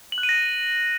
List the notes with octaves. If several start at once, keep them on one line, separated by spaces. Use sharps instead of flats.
F#7
F#6
D#7
A#6
D#7